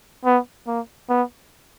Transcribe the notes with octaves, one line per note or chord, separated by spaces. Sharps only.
B3
A#3
B3